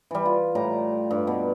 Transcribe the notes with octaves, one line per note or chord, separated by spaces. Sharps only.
E3 G3
F4
A2 G3 A#5
G2
B2